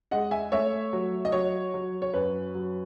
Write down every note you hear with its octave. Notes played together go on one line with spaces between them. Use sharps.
G#3 D#5 F#5
E5 G#5
A3 C#5 E5
F#3
D#5
F#3 C#5
F#3
C#5
F#2 B4
F#3